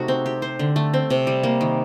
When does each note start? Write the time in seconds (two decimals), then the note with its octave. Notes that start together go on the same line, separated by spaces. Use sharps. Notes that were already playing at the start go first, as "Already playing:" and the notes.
Already playing: C3 A3 D#4 F#4
0.08 C4
0.26 G4
0.42 C5
0.59 D3
0.76 A3
0.94 C4
1.10 C3
1.27 G3
1.43 A#3
1.61 D#3